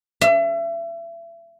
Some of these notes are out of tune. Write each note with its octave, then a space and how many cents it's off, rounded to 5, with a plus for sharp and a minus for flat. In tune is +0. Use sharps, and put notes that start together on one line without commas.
E5 +35